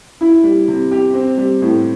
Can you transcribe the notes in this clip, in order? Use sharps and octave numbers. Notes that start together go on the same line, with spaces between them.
E4
G3
C3
G4
C4
G3
A2